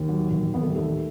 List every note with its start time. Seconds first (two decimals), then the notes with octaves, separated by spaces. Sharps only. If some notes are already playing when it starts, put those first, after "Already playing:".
Already playing: D#2
0.09 F#3
0.31 D#2
0.54 D#2 B3
0.62 A3
0.69 G3
0.76 D#2 A3